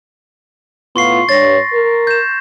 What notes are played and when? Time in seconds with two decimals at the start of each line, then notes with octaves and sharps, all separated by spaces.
0.96 A2 B3 F4 C6 C#6 C7
1.29 G2 C#5 A6 A#6
1.73 A#4
2.07 G6 E7